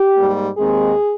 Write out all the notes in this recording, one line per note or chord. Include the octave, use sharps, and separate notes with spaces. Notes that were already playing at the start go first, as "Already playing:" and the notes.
Already playing: G4
G#2 G3 A#3
D#2 D#3 G#3 C4 G#4